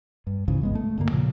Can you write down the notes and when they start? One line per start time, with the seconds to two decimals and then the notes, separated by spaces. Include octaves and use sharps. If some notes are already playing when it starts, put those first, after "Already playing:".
0.27 G2
0.48 D2 G#2 C#3 E3
0.61 A1 G#3 B3
0.75 A3
0.98 D2 G2 D3 A#3
1.11 A#2 C#3 F3